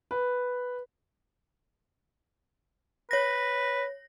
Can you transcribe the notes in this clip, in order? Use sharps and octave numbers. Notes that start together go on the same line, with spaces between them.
B4
B4 C#5 A#6